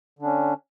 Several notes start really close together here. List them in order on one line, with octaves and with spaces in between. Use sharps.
D3 D4 C#4